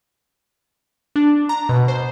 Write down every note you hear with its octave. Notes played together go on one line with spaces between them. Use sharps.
D4
A#5
B2
C5